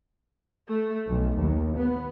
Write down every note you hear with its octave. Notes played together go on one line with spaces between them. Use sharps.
A3
B1
D#2
B3